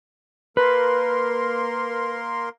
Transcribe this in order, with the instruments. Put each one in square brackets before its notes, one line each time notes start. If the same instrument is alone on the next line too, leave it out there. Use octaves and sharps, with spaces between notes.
[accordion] A#3 A#4 C6 [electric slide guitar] B4